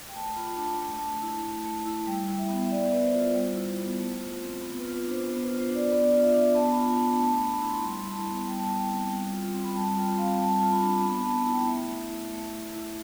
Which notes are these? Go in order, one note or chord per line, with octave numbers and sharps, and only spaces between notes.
G5
A3 A5
F4 B5
D4 A5
A3
A3
E4
A3
A3
E4
G3 G5
E4
E5
B3
E5
B3 D5
B3 B4
C5
F4
G3
E4
B3
A3
F4
C4
B3
B4
F4
B4
D4 C5
B3 C5
B4
F4
C5
D4
D5
B3 D5
D5
F4
E5
D4 E5
B3 A5
F4 B5
A5
D4
A3 A5
A3 B5
B5
E4
C6
G3 C6
E4
A5
B5
B3
G3 G5
A5
E4 G5
G5
C4
G3
F4
C4
B5
G3 A5
F4 G5
C4 F5
G3 A5
A5
F4
B5
D4
B5
B3 B5
A5
B3
A5
E4
G5
A3 E5
A3
E4
A3
A3
E4